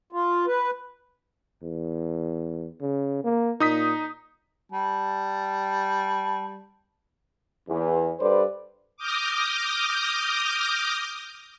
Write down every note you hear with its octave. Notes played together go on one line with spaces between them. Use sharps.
F4
B4
E2
C#3
A#3
A#2 D#4 D#6 B6
G3 A5
E2
G2 A4 B4 C5 D5
D6 D#6 F6 G6 A#6